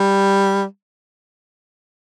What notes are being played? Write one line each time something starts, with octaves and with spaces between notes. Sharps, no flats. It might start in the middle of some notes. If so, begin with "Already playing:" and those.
Already playing: G3